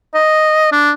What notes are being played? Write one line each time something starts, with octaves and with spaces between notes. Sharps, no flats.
D#5
D4